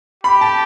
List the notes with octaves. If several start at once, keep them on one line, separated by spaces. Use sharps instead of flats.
G4 B5
A5